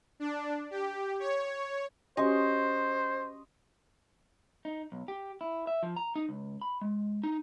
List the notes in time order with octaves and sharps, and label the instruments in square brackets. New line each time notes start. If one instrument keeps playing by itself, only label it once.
[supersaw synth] D4
G4
C#5
[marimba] C#4 F#4 G4 [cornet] C5 [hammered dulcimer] D#5 C6 C#6
[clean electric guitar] D#4
B1
G4
E4
E5
F3
A#5
D#4
C#2
B5
G#3
D#4